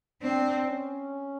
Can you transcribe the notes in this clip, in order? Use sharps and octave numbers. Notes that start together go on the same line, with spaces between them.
C4 D4
C#4